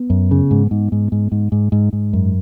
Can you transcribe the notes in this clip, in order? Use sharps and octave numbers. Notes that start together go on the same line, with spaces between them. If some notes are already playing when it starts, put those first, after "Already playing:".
Already playing: B3
F#2
C#3
G#2
G#2
G#2
G#2
G#2
G#2
G#2
G#2
F#2